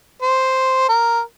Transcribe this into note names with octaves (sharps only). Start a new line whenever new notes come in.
C5
A#4